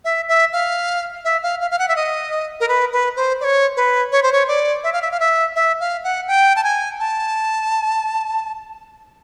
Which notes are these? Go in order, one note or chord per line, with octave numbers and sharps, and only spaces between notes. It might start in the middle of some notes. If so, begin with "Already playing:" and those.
E5
E5
F5
E5
F5
F5
F5
F#5
E5
D#5
A#4
B4
B4
C5
D5
C#5
B4
C#5
C5
C#5
D5
E5
F5
E5
F5
E5
E5
F5
F#5
G5
A5
G#5
A5